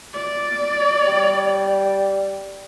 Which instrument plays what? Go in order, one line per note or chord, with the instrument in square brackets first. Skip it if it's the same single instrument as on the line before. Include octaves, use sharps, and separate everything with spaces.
[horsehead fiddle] D5
[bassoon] G3